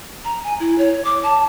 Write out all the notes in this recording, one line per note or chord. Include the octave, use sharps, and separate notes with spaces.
A#5
G#5
E4
C#5
D6
A5